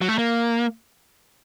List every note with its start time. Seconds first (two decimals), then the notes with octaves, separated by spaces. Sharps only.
0.01 F#3
0.09 A3
0.18 A#3